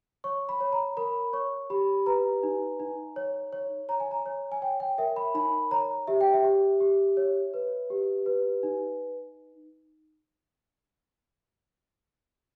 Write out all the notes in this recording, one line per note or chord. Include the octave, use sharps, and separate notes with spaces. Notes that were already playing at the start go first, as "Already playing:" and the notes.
C#5 C#6
B5
C#5
A#5
A#4 B5
C#5 C#6
G4 B5
B4 A#5
D#4
D#4
C#5
C#5
C#5 A#5
G#5
A#5
C#5
G#5
C#5 G5
G5
A#4 E5
B5
D#4 B5
C#5 A#5
G4 E5
G5
E5
G4
G4
C#5
B4
G4
B4
D#4